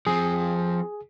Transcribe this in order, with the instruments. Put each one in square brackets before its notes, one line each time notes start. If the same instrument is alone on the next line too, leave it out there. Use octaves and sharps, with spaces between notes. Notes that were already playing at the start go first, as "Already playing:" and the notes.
[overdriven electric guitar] F3 C4 [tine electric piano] G#4